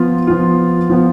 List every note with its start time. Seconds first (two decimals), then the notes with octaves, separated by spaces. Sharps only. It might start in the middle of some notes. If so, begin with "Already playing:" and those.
Already playing: F3 B3 F4
0.27 F3 B3 F4
0.89 F3 B3 F4